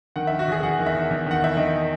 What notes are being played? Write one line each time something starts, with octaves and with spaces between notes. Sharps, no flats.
D#3 F#5
D#3 E5
F#4
E2 G#4
E2 F#5
D#3
E5
E2
E2
D#3 F#5
E2 E5
D#3 D#5